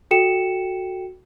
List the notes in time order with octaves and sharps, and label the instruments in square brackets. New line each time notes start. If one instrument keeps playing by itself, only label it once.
[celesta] F#4 A4 G5 C#7 E7